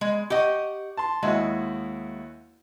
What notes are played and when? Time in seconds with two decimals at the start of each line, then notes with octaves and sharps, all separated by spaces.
0.01 G#3
0.30 G4 D#5 F#5 C#6
0.97 A5 C6
1.23 D#2 G#3 E4 F#4